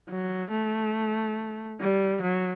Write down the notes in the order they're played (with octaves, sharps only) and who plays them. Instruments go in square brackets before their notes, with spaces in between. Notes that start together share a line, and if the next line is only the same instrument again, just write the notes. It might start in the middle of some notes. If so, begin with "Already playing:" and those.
[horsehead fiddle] F#3
A3
G3
F#3